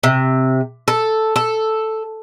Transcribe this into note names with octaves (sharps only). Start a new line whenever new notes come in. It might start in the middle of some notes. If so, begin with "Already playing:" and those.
C3
A4
A4